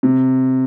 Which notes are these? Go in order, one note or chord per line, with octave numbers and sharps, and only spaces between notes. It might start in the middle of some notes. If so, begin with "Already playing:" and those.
C3